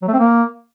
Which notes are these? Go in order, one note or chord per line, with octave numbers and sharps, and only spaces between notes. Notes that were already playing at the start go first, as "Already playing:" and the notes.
F#3
A3
C4
A#3